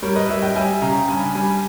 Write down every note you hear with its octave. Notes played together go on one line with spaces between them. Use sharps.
G3 A#4 C#5
B4 D#5
G3 C#5 E5
D#5 G5
G3 E5 G#5
C#3 G5 A#5
G2 G#5 B5
G3 G#5 B5